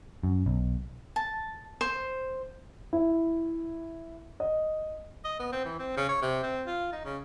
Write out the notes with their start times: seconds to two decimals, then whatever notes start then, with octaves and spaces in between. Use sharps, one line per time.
0.23 F#2
0.46 B1
1.16 A5
1.81 C5
2.93 E4
4.40 D#5
5.24 D#5
5.39 B3
5.52 C4
5.65 E3
5.79 C4
5.97 C#3
6.09 C#5
6.22 C3
6.43 C4
6.66 F4
6.92 D#4
7.04 C#3